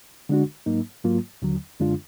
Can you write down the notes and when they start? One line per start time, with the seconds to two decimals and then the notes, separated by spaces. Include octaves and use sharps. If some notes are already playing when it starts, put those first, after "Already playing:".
0.29 D3 G#3 D4 F#4
0.66 G#2 F#3 A#3 D#4
1.04 G#2 F#3 A#3 F4
1.42 D#2 D3 F#3
1.80 F#2 D3 G#3 D4 F4